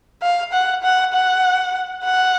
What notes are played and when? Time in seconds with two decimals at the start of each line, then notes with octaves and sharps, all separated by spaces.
0.22 F5
0.53 F#5
0.83 F#5
1.14 F#5
2.04 F#5